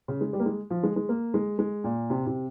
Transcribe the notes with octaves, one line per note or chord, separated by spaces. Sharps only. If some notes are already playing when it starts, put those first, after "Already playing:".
C#3
G#3
G3
A#3
G#3
F3
G#3
G#3
A#3
G#3
G#3
A#2
C3
C3